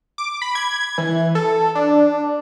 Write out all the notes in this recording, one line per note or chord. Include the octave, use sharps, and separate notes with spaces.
D6
B5
G#6
E3
A4
D4